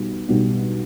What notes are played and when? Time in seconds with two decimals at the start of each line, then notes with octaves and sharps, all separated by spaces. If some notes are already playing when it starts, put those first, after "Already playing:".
Already playing: B1 B2 G3 B3
0.29 B1 B2 G3 B3